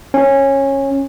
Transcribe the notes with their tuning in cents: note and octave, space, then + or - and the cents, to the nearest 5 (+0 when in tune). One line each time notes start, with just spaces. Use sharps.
C#4 -15